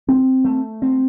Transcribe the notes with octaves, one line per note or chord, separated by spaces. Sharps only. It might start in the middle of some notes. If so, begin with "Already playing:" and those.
C4
A3
C4